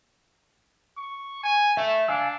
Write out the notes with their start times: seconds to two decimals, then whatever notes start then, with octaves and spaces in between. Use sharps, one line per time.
0.97 C#6
1.43 G#5
1.77 A3 E5
2.08 D4 F5 G#5 E6